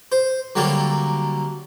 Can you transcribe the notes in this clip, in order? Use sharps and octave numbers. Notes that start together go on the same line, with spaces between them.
C5
D3 F#3 G3 A#3 A4